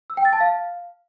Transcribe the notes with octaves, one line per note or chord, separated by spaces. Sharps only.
E6
G5
A6
A5
F5